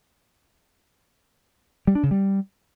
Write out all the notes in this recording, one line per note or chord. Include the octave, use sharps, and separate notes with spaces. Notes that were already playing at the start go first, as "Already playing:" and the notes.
G3
D4
C#3
G3